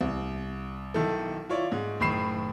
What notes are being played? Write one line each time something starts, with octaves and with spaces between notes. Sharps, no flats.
C2
B1 D#3 E4 A4
E4 F4 C#5 D5
G#2
F#1 A2 D#3 B5 C7 E7